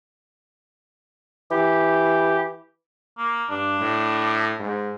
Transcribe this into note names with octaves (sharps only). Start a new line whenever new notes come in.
E3 G4
A#3
G2 D4
A2
G#2